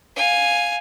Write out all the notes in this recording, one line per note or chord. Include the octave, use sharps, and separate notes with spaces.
F5 G#5